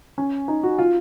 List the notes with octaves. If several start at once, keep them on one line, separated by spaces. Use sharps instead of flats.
C#4
D#4
F#4
F4